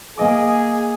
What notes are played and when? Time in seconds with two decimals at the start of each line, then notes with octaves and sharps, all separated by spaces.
0.17 A#3 G#4 D#5 D6